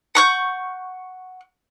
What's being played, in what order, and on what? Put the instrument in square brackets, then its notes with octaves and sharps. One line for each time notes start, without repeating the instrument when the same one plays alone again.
[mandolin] F#5 C#6 G6